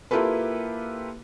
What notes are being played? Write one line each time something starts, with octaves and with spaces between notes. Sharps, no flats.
A#3 E4 F4 G4 A4 B4